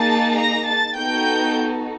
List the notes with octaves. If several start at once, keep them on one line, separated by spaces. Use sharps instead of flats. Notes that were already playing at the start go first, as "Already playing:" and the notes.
Already playing: A#3 D#4 G#4 A5 A6
A#5 A#6
A5 A6
B3 D#4 F#4 A4 G5 G6